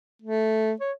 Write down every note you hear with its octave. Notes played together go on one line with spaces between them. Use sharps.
A3
C#5